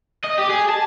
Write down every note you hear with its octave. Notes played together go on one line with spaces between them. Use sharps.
D#5
G4
G#4
A5